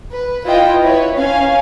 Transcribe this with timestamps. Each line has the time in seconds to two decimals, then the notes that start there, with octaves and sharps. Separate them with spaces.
0.10 B4
0.44 E4 F4 B4 D#5 G5
0.81 E4 B4 C#5
1.16 C#4 F5 G#5